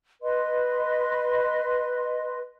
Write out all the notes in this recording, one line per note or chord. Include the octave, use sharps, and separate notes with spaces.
B4 D#5 C6